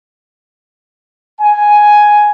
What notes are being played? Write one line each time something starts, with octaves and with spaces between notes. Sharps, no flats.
G#5